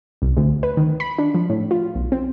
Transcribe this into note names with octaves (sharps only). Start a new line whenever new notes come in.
C2
D2
B4
D#3
B5
D4
F3
A2
F4
B1
C4